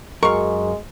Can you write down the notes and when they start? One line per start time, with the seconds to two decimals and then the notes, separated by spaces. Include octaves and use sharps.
0.23 F#2 G#3 A#4 F5 C#6